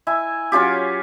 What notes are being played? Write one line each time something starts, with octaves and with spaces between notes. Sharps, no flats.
E4 E5 G#5
F#3 C#4 F4 G4